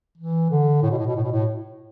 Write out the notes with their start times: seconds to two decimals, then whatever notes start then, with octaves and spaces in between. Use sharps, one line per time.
0.18 E3
0.50 D3
0.82 A2
0.91 B2
0.98 A2
1.07 B2
1.15 A2
1.24 B2
1.32 A2